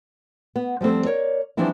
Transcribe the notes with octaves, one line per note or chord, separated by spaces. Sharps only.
B3
F3 G3 A3 C4 A4
A#4 C#5 D5
E3 F3 G3 C4 D4 E4